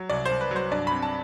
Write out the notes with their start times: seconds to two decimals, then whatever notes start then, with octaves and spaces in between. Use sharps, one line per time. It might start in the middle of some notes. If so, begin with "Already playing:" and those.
Already playing: F#3
0.10 C2 D5
0.25 C5
0.31 C2
0.41 B4
0.51 F#3 C5
0.72 G2 D5
0.87 C4 B5
1.02 A5